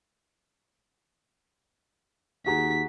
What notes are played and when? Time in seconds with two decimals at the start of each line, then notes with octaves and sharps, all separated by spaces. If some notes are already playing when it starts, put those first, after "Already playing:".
2.46 D#2 F#4 G#4 A#5 B6